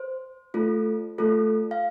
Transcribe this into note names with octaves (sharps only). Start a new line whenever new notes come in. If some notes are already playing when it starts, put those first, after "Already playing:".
Already playing: C5
A3 F4 A4
A3 F4 A4
F5